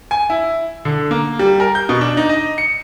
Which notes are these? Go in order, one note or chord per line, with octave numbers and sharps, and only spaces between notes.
G#5
E4
D3
A#3
G3
A#4
G6
B2
D4
D#4
D#5
C#7